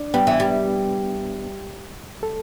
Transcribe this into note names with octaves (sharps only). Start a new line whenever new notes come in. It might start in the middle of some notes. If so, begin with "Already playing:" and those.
Already playing: D4 D5
G3 B3 B4
E3
G3
A4